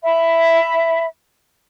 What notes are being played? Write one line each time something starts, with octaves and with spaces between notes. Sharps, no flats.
E5 B5